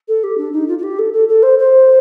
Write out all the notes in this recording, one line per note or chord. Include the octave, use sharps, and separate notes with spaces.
A4
G4
D4
D#4
F4
F4
G4
A4
A4
A4
C5
C5